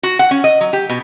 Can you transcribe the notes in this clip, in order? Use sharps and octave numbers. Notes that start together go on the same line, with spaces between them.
F#4
F#5
C#4
D#5
F#3
G4
B2